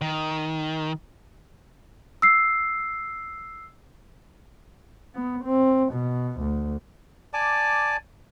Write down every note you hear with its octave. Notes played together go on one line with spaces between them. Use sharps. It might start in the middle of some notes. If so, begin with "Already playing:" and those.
D#3
E6 C7
B3
C4
B2
D2
D5 G#5 A5 D6